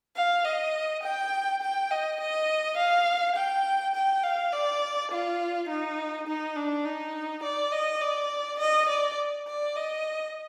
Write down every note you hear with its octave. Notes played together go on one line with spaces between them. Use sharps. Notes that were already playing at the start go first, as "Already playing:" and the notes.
F5
D#5
G5
G5
D#5
D#5
F5
G5
G5
F5
D5
F4
D#4
D#4
D4
D#4
D5
D#5
D5
D#5
D5
D5
D#5